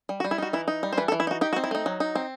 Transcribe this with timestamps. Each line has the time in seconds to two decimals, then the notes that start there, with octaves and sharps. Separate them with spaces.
0.09 G3
0.20 F#4
0.24 G3
0.31 E4
0.38 D#4 F#4
0.53 E3 E4
0.68 D#4
0.83 G3
0.93 C5
0.98 E3 B4
1.08 A4
1.12 E3
1.20 E4
1.27 D#4 F#4
1.41 D#4 G4
1.53 F#4
1.56 C4
1.64 E4
1.71 A3 D#4
1.86 F#3
2.00 D#4
2.15 C4